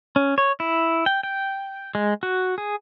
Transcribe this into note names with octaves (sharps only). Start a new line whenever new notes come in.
C#4
C#5
E4
G5
G5
G#3
F#4
G#4